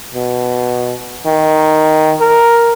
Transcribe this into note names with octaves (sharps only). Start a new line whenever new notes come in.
B2
D#3
A#4